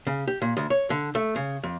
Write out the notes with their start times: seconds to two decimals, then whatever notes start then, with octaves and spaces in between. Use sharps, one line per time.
0.07 C#3
0.28 G4
0.42 A#2
0.57 D2
0.70 C#5
0.90 D3
1.15 A3
1.36 C#3
1.63 F2